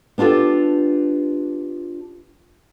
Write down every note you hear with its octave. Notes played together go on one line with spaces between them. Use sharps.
B3 D4 F4 G4 A4